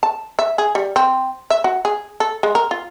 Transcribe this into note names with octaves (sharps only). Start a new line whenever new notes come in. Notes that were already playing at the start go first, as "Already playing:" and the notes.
A5
E5
G#4
G3
C4
E5
F#4
G#4
A4
G#3
A#4
F4